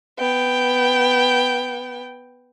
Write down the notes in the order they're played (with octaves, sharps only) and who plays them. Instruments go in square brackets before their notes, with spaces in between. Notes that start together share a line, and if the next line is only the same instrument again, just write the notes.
[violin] B3 G5